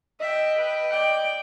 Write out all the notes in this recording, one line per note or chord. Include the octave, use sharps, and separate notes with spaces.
D#5 E5 G5
B4 G5
D5 G5